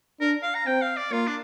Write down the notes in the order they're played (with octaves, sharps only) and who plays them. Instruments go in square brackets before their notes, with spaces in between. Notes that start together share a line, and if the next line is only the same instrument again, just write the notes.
[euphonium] D4 [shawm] A#4
[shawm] F5
A#5
[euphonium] C4 [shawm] G5
[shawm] F5
D5
[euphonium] A#3 [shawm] F4
[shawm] D4